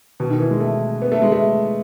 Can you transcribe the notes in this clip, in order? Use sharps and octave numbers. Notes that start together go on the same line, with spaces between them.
B2
D#3
E3
G#3
A3
B3
A3
G#3
A3